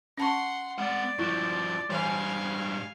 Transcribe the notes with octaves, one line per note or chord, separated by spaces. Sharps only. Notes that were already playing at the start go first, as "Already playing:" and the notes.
C#4 F#5 A5 C6 C#6
G#3 C4 D5 F#5
G2 F3 E4
G#2 E3 G3 F5 G#5